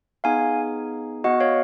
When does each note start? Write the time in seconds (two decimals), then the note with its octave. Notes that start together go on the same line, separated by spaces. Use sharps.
0.24 B3 D#4 G#4 F5 G#5
1.24 B3 F#4 D#5 F#5
1.40 C#5 F5